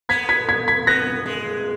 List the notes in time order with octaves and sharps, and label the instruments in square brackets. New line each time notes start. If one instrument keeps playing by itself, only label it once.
[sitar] B3 [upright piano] G#6 B6
[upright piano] G#6 B6
G#6 B6
G#6 B6
[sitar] B3 [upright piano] F#6 A#6
[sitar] G#3